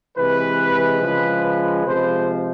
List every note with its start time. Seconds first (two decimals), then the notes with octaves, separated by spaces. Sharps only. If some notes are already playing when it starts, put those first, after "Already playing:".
0.17 C3 E3 G#3 B4
1.02 C#3 F3 G#3
1.85 C3 F3 G#3 C5